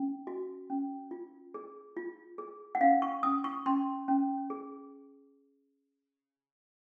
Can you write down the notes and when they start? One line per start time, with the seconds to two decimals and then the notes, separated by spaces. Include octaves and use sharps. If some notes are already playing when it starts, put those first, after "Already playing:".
Already playing: C#4
0.27 F#4
0.70 C#4
1.11 F4
1.54 G#4
1.97 F4
2.38 G#4
2.75 F#5
2.81 C#4 F5
3.02 C#6
3.23 C#4 D#6
3.44 C#6
3.66 C#4 C6
4.08 C#4
4.50 G#4